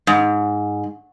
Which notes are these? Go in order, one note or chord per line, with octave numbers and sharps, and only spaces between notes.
G#2